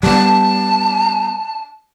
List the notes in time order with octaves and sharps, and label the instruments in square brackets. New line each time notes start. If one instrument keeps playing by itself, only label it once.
[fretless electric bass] G3 B3 [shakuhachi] A5